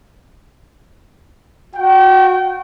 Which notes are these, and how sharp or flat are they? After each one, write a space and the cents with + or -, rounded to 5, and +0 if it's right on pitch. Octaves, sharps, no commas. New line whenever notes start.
F#4 -20 G5 -35